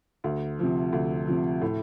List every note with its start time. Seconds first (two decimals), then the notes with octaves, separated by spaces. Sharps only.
0.24 D2
0.59 C3 F3
0.93 D2
1.27 C3 F3
1.62 A2